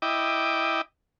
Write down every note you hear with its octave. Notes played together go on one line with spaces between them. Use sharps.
E4 D#5 G5 D6